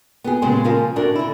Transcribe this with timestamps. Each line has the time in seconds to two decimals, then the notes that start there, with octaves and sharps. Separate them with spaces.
0.24 B3 G4 G#4
0.42 A#2 C#3 G#3 B3 G4 C5
0.64 C#3 F3 A#3 A#4 F5 G#5
0.96 D2 A2 D4 F#4 A#4
1.16 D3 E4